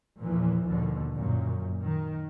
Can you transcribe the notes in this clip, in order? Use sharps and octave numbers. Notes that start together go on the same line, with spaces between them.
E2 A#2 E3 F3
D#2 B2 D3
F#2 A#2
D#3